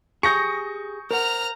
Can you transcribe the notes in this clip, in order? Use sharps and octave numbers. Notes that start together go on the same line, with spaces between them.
G4 G#4 C#6 D#6 G6 A#6 C#7
A#4 C5 F#5 A#5 F6